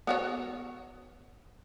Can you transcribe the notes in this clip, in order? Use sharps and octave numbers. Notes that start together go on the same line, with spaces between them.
B3 F#4 C#5